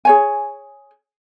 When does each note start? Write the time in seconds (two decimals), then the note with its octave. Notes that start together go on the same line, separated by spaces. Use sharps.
0.05 G#4 C#5 G#5